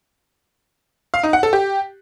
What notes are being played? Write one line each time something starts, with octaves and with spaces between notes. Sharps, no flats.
F5
D#4
F#5
A4
G4